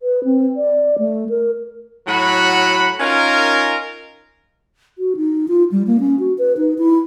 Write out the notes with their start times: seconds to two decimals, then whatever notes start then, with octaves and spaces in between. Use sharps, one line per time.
0.01 B4
0.24 C4
0.56 D5
0.98 A3
1.29 A#4
2.07 A2 F#3 F#4 F#5 B5
3.00 C#4 D#4 F4 A#4
4.98 F#4
5.17 D#4
5.48 F4
5.72 G3
5.87 A#3
6.00 C#4
6.19 F#4
6.38 B4
6.57 D#4
6.78 E4